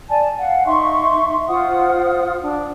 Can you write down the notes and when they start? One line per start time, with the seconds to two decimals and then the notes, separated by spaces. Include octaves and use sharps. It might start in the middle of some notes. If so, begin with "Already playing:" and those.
0.10 D5 G#5 A5
0.40 F5 F#5
0.66 D#4 E5 C6 C#6
1.48 F4 C5 F#5 D#6
2.42 D4